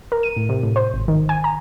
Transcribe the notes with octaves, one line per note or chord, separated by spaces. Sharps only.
A#4
D#7
A2
C3
A2
C5
G#1
D#3
G#5
A#5